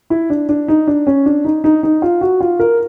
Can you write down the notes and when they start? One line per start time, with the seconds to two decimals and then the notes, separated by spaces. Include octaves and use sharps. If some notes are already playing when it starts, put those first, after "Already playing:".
0.10 E4
0.30 D4
0.49 D4
0.68 D#4
0.87 D4
1.07 C#4
1.26 D4
1.45 D#4
1.64 D#4
1.83 D#4
2.02 F4
2.21 F#4
2.41 F4
2.60 A#4